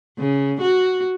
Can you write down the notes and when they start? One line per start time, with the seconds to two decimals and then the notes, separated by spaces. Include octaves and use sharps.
0.19 C#3
0.61 F#4